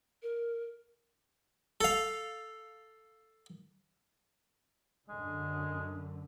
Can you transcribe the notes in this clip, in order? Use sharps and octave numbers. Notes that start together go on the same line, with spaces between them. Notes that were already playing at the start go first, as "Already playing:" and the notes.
A#4
A4 F5
F#2 D3 G#3